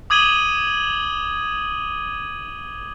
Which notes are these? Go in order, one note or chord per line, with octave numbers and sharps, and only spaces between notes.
D6 D#6 G#6 D#7 F#7 G7